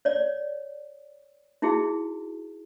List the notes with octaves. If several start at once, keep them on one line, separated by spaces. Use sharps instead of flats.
C#5 D5
D#4 E4 F#4 G#4